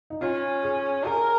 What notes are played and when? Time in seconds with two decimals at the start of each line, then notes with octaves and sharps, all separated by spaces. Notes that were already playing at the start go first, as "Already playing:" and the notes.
0.10 D#4
0.21 C#4 F4
0.63 G#4
1.05 G#4 A#4